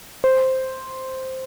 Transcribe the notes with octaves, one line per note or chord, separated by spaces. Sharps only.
C5